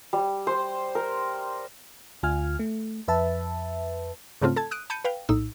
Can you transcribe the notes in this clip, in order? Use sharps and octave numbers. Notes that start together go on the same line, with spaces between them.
G3
C5
A#4
D2 F4 G#5 F6
A3
F2 B4 E5 A5
G#2 C#3 A3 C4 F4
A4 A5 G#6
D#6 F#6 D7 D#7
A5 B5 G6 C#7 D#7
B4 F5 G5
A#1 A2 D#4 E6